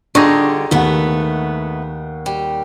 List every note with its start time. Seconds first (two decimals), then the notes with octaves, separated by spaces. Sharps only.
0.15 D3 G3 D4 D#4 F4 G#4 C#6 A#6
0.71 D#2 A3 B3 F#5
2.26 G3